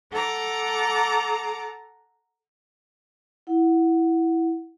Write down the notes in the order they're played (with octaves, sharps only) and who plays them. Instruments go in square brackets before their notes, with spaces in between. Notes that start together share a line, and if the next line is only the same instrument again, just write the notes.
[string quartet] A4 F#5 A#5 D6
[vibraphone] E4 F#5